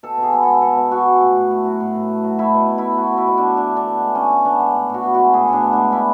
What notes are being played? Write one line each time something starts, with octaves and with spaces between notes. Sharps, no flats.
B2 A4
B2 G#4
B3
G#3 A4
B2 A4
B2
B3 F#4
G#3
A2
A2
A3
F#3
A2
A2
A3
F#3
A3 E4
B2
B2
A3 E4
A3 F#4
B2 E4
B2
A3 D4
D3 D4
D3
D4
B3
G#3
D3 C#4
D3
B3 D4
G#3
A2
A2 F#4
B3
G#3 F#4
A2 G#4
A2 D4
B3
G#3 D4
D3 E4